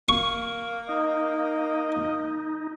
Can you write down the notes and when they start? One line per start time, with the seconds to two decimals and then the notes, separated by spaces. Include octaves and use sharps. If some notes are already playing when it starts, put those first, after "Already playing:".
0.09 A#3 C#6
0.89 D#4 D#5